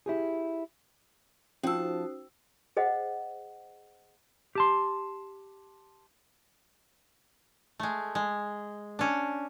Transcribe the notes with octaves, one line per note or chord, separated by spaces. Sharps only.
E4 G4 G#4
F3 C#4 D#4 F#4 C5 A5 E6
G#4 C5 D#5 F5 F#5
G4 A5 C6
G#3 A3
G#3
C#4 D4